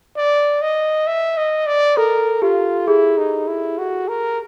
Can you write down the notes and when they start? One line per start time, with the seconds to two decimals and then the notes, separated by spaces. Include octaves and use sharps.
0.17 D5
0.62 D#5
1.07 E5
1.37 D#5
1.67 D5
1.97 A4 A#4
2.42 F4 G4
2.88 E4 G#4
3.18 D#4
3.48 E4
3.78 F#4
4.09 A#4